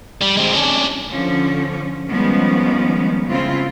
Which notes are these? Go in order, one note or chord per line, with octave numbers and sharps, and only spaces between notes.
G3
G#3 C4
C#4 D4
D3 F3 C#4
D#3 F3 G3 G#3 B3 C#4
C#3 C4 E4 F4